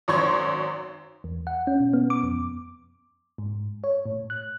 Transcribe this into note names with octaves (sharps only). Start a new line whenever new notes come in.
G#1 F#2 C6 C#6 G#6
E2
F#5
C#4
B2
B3
D6
F2
G#2
C#5
A2
F#6